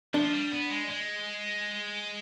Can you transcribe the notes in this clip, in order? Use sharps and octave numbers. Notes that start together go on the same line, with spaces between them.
F3 D4
G3
B3
G#3
G#3